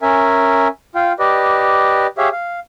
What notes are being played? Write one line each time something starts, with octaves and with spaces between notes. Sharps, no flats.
C#4 A#4 E5 G#5
F4 F5 G5
G4 B4 D5 D#5
G4 G#4 C#5 E5 F5
F5